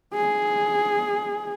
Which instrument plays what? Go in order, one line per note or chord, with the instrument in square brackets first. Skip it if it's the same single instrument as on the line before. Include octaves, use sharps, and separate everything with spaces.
[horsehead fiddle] G#4